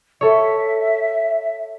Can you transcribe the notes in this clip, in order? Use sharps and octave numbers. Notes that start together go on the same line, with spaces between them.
A4 C#5 E5